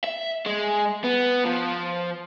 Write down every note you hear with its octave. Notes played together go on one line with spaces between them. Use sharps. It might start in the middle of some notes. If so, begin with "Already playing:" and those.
E5
G#3
B3
F3